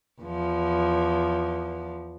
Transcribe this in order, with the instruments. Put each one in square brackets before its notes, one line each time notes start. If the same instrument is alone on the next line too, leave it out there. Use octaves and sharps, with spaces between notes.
[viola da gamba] E2 F3